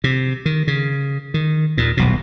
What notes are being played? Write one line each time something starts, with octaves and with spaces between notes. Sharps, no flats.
C3
D#3
C#3
D#3
D#2 A#2
D#1 B1 B2